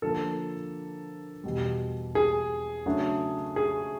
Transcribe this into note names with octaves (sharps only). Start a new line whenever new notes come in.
D3 F3 A#3 A4
E2 B2 G3
G#4
C#3 F#3 A3 D4
G#4